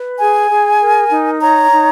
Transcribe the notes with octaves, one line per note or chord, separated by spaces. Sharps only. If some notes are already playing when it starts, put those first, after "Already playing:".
Already playing: B4
G#4 G#5
G#4
A#4
D#4
C#5 A#5
D#4